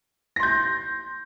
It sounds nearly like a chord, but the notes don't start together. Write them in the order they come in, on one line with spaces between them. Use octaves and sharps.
A#6 C6 G6